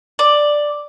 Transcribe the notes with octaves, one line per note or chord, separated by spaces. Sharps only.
D5